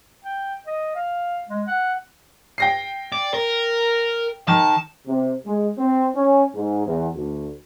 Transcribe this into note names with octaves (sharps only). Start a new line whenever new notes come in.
G5
D#5
F5
G#3
F#5
G5 A#6 C7
D5
A#4
D#3 A5
C3
G#3
C4
C#4
G#2
E2
D2